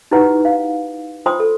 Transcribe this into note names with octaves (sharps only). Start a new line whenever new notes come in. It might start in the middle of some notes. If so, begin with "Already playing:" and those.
D#4 E4 F#4 G4 B4 F#5
F5
F4 C5 G5 C6 D#6
A4